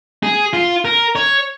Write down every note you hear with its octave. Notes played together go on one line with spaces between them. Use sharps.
G#4
F4
A#4
C#5